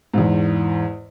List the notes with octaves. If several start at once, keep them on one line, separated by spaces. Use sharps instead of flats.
E2 G#2